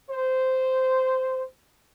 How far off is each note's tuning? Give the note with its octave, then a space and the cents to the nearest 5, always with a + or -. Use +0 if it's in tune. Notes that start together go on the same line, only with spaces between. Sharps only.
C5 -10